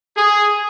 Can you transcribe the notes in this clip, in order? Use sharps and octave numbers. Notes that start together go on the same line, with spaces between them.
G#4